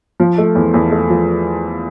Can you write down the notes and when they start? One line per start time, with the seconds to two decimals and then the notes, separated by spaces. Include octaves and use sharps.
0.20 F3
0.38 A3
0.55 E2
0.74 E2
0.92 A3
1.10 F3